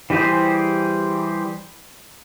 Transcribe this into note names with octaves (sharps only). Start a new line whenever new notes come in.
E3 G3 G4 G#4 C5